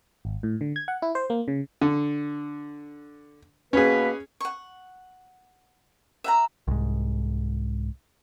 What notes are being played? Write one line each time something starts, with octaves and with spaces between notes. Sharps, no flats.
G#1
A2
D3
G#6
F#5
E4
C5
A#3
C#3
D3
B2 A#3 C#4 G#4 B4
F#5 C#6
E5 F#5 A#5
C2 G#2